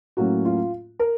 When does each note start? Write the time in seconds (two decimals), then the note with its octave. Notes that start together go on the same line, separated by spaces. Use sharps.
0.17 A2 F#3 A#3 C#4 F#4
0.45 F4
0.99 A#4